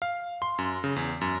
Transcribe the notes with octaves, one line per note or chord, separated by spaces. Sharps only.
F5
C6
F#2
C#3
E2
F#2